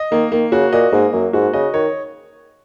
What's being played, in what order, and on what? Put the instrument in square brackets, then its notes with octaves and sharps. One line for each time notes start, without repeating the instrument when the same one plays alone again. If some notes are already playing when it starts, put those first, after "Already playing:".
Already playing: [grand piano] D#5
[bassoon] D#3 [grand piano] A#3
[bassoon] D#3 [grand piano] A#3
[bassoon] C#3 [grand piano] F#4
[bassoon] A#2 [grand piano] D#5
[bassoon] G#2 [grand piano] A#3
[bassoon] F#2 [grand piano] A#3
[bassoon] G#2 [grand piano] F#4
[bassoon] C#3 [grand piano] D#5
[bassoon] D#3 [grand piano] C#5